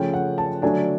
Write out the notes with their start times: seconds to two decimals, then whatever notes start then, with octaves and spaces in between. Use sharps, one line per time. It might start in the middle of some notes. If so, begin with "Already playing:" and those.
Already playing: C#3 F3 A3 C#4 G5
0.14 F#5
0.38 A5
0.62 D3 F#3 A3 D4 G#5